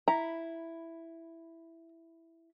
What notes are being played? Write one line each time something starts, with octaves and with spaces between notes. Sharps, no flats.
E4 A#5